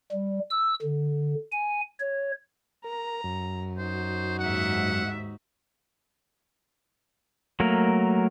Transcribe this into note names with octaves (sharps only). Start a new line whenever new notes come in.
G3
E6
D3
G#5
C#5
A#4 A#5
F#2
D#4 F#4 C5
D#2 G#2 E5 F#5
F#3 A3 A#3 A#4